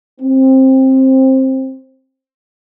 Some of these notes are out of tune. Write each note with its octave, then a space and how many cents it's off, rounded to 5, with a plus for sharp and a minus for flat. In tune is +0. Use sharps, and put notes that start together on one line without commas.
C4 +15